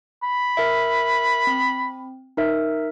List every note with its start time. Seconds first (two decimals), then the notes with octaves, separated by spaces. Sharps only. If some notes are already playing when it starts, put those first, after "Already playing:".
0.23 B5
0.57 A#4 E5
1.47 C4
2.37 D#4 A#4 E5